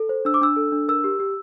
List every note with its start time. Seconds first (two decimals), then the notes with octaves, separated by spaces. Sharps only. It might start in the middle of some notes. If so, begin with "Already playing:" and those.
Already playing: A4
0.09 C5
0.25 D4 E6
0.34 D6
0.41 D4 E6
0.56 A4
0.72 D4
0.88 A#4 E6
1.04 G4
1.20 G4